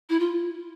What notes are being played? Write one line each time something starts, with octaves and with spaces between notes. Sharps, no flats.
E4
F4